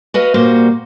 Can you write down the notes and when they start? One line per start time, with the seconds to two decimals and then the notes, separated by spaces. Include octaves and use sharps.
0.14 F#4 B4 D#5 F5
0.34 A#2 G3 A#3 F#4 C5